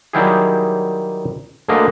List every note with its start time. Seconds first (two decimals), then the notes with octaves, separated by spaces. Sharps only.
0.13 D#3 F#3 G3 E4 G4 G#4
1.68 D2 D3 A3 A#3 G#4 D#5